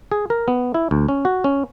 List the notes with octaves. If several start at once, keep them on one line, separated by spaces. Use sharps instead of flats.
G#4
A#4
B3
E4
D2
C#4
F#4
C#4